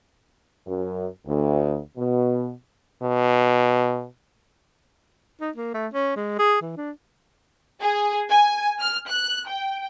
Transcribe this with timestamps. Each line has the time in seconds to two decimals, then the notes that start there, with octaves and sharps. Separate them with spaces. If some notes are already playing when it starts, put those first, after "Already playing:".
0.66 F#2
1.26 D2
1.96 B2
3.03 B2
5.41 D#4
5.56 A#3
5.74 A3
5.94 C#4
6.16 G#3
6.39 G#4
6.62 E3
6.77 D4
7.80 G#4
8.30 G#5
8.80 F6
9.09 F#6
9.47 G5